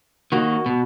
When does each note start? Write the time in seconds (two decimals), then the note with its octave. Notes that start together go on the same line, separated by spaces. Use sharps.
0.32 D#3 A#3 F#4
0.66 B2